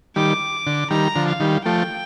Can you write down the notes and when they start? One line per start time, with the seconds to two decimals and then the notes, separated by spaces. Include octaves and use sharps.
0.16 D#3 G3 D6
0.67 D3
0.90 D#3 G3 A#5
1.16 D3 F3
1.28 F5
1.40 D#3 G3
1.65 F3 A3 G5